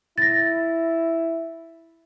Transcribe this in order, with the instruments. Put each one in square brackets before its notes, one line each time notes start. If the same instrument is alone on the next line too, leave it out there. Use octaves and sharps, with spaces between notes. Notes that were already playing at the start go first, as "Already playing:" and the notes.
[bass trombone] E4 [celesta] A6 A#6